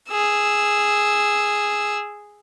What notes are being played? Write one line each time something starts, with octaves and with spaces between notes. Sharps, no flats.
G#4 E6